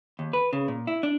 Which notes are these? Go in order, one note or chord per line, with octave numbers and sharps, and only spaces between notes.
D#2
B4
C#3
A#2
E4
D4